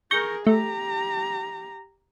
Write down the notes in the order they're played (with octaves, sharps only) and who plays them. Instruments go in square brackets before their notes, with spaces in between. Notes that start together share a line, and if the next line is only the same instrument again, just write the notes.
[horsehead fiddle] G#4 A#4 [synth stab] C#6 G6 A#6
[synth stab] A3 [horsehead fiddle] G4 A#5